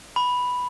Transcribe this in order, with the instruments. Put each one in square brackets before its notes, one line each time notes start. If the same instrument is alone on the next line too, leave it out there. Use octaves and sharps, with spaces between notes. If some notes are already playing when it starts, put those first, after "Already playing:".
[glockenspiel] B5